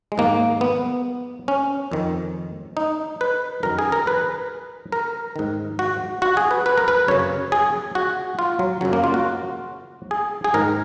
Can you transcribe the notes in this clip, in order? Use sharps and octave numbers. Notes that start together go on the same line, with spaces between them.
G#3
G#2 D#3 A#3
B3
C#4
F2 D#3
D#4
B4
F#2 D#3 A#4
G#4
A#4
B4
A#4
G#2 D#3
F#4
F#4
G#4
B4
B4
A#4
B4
F#2 C#3 C#5
G#4
F#4
F4
F#3
F#2 C#3 F#3
A#3
F4
F#4
G#4
G#4
G#2 D#3 A#4